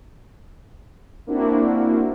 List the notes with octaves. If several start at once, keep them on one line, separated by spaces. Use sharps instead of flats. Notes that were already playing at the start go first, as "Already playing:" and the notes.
A#3 C4 D4 E4 F#4